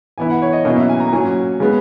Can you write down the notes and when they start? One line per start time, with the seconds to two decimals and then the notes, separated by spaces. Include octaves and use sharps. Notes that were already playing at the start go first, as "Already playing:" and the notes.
0.18 E3 B3 E4 G#5
0.30 F#5
0.42 C#5
0.53 D#5
0.65 B2 F#3 A#3 C#4 E4 D#5
0.76 E5
0.89 G#5
1.00 A#5
1.12 A#2 F#3 C#4 G#5
1.60 C#3 G#3 B3